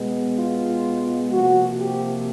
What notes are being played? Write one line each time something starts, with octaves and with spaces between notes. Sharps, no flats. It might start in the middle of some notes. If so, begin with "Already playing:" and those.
Already playing: B2 G#3 B3
F4
C3 F3 A#3 F#4
G4